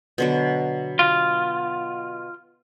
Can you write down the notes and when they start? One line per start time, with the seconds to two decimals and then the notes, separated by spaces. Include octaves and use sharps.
0.18 B2 D3 F#3
0.99 F4